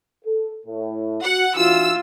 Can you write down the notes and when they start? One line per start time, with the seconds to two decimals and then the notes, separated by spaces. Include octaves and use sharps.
0.24 A4
0.66 A2
1.23 F#4 F#5
1.57 E3 D4 F4 F#4 E6